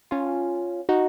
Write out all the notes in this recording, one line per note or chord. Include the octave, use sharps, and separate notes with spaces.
C#4 F4
D#4 F#4